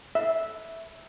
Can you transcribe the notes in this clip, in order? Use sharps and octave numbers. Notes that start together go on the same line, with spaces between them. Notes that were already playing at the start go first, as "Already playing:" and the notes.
E5